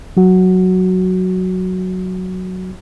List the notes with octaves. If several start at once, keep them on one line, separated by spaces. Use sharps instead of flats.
F#3 F#4